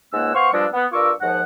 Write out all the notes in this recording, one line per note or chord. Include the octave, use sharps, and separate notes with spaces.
C#2 G#2 A#3 F#5 E6
B3 C5 F5 C#6
G2 F3 G3 G#3 D4 E6
B3
G2 F4 A#4 C#6 D6 E6
D#2 G#2 F3 F#5